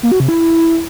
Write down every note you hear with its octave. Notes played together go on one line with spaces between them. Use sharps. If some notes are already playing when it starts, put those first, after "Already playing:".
A#3
F#4
C3
E4